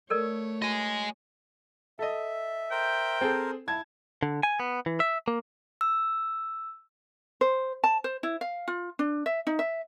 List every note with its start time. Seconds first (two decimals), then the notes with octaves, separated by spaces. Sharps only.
0.10 A3 A4 A#4 C#5 D5
0.62 F#4 D#5 G#5
1.99 A4 D#5 E5
2.71 A#4 C5 G5
3.21 C4 G#4 A4
3.68 E4 A5 G#6
4.23 D3
4.43 G#5
4.60 B3
4.86 E3
5.00 E5
5.28 A#3
5.81 E6
7.41 C5
7.84 A5
8.04 C5
8.23 E4
8.41 F5
8.68 F4
8.99 D4
9.26 E5
9.47 D#4
9.59 E5